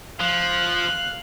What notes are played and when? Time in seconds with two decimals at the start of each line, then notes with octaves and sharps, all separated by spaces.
0.20 F3 F5 F#6